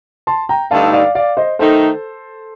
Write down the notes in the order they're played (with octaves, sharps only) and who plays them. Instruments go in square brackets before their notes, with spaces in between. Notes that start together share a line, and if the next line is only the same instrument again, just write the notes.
[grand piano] A5 C6
G5 A#5
[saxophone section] G2 D3 A3 D#4 A4 [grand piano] F5 A5
[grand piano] D5 F5
D5 F5
C5 D#5
[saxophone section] D#3 A3 D#4 [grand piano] A4 C5